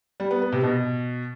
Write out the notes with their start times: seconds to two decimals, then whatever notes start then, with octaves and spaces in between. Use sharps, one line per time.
0.20 G3
0.31 B3
0.41 B3
0.52 C3
0.63 B2